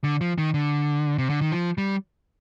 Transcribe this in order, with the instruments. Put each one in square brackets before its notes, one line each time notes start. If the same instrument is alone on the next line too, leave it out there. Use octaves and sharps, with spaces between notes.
[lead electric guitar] D3
F3
D#3
D3
C3
D3
D#3
F3
G3